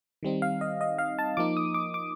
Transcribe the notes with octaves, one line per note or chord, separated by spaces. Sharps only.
D#3 G3 C4 D#4
F5
D#5
D#5
F5
A5
F3 A#3 D#4 D6
D#6
D6
D6